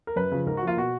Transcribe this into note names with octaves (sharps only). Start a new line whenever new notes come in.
A#4
F#2 B4
C#3 F3
G#2 A#4
F#4
F3 A#3 F4
B2 F#4